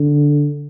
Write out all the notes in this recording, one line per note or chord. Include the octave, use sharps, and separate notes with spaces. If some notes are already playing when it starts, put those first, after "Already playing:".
Already playing: D3